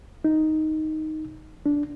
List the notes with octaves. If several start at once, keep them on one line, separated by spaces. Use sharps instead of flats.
D#4
D4